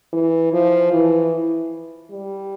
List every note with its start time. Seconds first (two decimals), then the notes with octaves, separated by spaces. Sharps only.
0.13 E3
0.53 F3
0.93 E3
2.11 G3